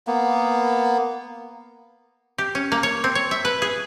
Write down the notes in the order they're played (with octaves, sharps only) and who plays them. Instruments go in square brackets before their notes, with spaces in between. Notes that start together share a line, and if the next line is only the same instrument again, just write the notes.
[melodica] A#3 B3
[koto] G4
C#4
A#3
C#5
C4
C#5
E5
B4
G#4